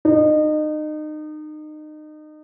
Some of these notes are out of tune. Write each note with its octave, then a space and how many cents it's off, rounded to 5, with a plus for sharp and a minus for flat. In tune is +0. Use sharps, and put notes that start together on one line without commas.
D#4 -30